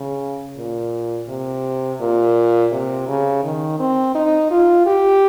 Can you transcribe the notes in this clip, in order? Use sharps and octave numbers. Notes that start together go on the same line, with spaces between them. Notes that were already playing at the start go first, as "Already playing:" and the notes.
Already playing: C#3
A#2
C3
A#2
C3
C#3
D#3
C4
D#4
F4
G4